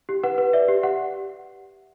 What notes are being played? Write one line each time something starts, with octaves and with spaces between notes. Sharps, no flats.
G4
B4 F#5
B4
D5 E5
G4
G4 F#5